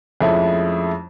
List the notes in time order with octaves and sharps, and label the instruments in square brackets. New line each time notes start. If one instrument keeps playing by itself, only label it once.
[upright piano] F2 F3 G#3 A3 C#4 E4